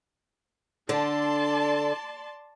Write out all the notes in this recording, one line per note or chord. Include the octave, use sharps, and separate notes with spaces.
D3 D4 D5 A5 C6